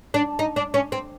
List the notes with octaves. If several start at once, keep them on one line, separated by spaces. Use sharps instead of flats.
D4
D#4
D4
C#4
C4